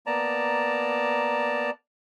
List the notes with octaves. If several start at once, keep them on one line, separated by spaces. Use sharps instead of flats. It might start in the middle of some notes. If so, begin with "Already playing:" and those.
A#3 B3 D5 A5 A#5